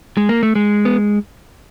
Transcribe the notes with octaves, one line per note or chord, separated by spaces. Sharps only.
G#3
A#3
A3
G#3
B3